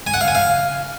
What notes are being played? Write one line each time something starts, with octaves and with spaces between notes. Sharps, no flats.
G#5
F#5
F5
G#5
F5